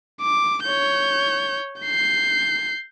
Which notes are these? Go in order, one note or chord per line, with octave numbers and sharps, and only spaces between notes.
D6
C#5 G6
G6 C7